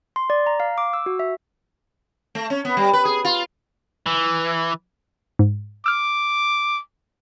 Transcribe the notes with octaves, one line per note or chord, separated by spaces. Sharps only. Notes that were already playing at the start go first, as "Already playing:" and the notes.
C6
D5
A#5
F5
D6
E6
F#4
E5
A3
C#4
B3
G3
B4
G#4
F4
E3
G#2
D6 E6 F6